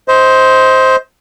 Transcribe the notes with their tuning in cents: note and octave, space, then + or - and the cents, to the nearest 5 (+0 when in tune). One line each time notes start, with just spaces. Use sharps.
C5 +0 D#5 +35